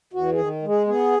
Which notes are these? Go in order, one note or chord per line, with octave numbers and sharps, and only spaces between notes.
E2 F#4
G#4
D#3
G#3
G#4
B3 G#4